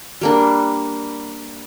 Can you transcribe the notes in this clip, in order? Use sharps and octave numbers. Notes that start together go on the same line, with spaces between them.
G3 A#3 D4